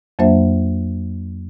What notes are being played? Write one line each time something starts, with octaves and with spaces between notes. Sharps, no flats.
F2 F#3 A#3 D4 C5 E5